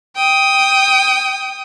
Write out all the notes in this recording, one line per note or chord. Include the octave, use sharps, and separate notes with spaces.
G5 D#6